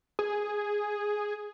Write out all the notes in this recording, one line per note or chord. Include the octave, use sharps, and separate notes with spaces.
G#4